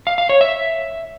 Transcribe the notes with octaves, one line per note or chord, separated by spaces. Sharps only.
F5
F5
C#5
E5